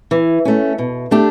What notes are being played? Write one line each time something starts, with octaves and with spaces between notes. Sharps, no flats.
E3
A3 C#4
B2
A3 D4 G4